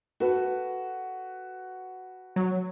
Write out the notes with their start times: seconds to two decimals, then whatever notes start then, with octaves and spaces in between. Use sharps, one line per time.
0.20 F#4 A4 B4
2.36 F#3